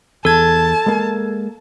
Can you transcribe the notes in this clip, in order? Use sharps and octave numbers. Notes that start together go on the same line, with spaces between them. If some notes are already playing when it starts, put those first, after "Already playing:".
E2 A4 A5 G#6
G#3 A#3